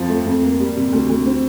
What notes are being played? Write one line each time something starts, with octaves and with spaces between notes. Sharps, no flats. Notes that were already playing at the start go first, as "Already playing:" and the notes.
Already playing: F2 F3
A3
F2
A#3
G3
C3
D2
D2
C4